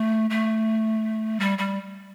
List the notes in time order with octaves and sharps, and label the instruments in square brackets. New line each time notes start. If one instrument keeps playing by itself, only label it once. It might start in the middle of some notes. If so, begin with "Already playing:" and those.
Already playing: [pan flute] A3
A3
G3
G3